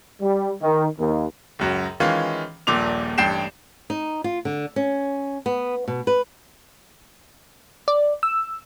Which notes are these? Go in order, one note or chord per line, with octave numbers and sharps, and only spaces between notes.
G3
D#3
D#2
C#2 F#2 F#3
D#3 E3 G#3 C#4 F4
D#1 A#1 A#2 D6 F7
A1 G2 G5 G6 C7 E7
D#4
F4
D3
C#4
B3
B2
B4
D5
E6